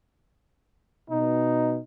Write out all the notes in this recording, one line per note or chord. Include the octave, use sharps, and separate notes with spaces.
B2 D#4